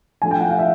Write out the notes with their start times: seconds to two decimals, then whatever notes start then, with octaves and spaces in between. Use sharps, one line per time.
0.22 F3 A3 D4 G#5
0.31 G5
0.41 F#5
0.49 F5
0.59 E5